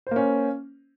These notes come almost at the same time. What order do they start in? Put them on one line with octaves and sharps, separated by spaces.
C5 A#3 C#4